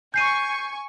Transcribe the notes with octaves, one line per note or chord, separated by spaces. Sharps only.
G#5 C#6 G6 C7 D#7